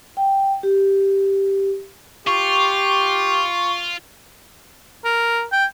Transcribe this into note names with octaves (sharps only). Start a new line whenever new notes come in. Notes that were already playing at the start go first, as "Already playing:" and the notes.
G5
G4
F4 G4 C#6
A#4
G5